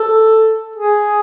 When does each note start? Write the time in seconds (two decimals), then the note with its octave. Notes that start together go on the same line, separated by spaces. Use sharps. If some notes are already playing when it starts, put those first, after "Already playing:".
Already playing: A4
0.76 G#4